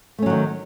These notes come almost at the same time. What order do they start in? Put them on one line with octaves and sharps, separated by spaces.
A3 C#4 F#3 D#3